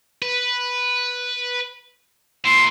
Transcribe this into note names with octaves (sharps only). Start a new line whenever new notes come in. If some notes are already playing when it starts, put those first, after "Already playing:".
B4
A#2 E4 C6